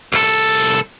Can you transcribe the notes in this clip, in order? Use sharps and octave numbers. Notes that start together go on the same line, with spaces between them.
C2 A4